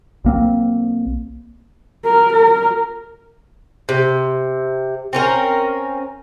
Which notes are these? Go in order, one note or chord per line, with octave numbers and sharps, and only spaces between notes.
B1 A#3 C4
A#4
A#4
C3
C4 C#4 A#4